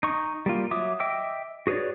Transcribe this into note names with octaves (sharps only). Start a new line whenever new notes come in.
D#4 C#6
G3 A#3 F4
F#3 E5 D6 D#6
D#5 E5 G5 D6 E6
F#4 G#4 B4 C#5 D5